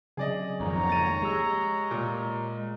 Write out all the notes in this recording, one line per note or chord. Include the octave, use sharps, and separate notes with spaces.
C#3 F#3 C4 G#4 D5 D#5
F2 G#2 D#3 C#5 A#5
A#3 A6 D#7
G#3 G4 E6
A#2